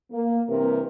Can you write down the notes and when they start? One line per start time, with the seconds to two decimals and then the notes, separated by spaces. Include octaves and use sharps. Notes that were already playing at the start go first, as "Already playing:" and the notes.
0.12 A#3
0.49 G2 C3 E3 A#4